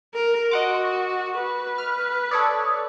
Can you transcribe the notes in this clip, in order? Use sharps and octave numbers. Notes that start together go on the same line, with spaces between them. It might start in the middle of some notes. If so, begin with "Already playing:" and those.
A#4
F#4 D#5 F#5 C6 D6
C#6
B4 B5
F6
A4 C#5 D5 D#6